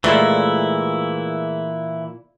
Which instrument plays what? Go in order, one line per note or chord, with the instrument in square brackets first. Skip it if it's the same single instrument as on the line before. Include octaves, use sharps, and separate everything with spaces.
[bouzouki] A#2 [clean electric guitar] E3 E4 [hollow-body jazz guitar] G#3 A3 F4